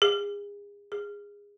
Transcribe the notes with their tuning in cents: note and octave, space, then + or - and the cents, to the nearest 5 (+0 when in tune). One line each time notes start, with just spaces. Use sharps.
G#4 -35
G#4 -25